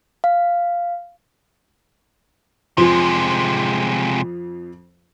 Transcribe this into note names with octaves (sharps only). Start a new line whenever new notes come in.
F5
F2 C3 F3 G#3